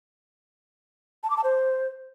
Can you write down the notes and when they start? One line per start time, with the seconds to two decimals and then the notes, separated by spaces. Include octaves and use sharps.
1.23 A5
1.30 D6
1.37 A5
1.44 C5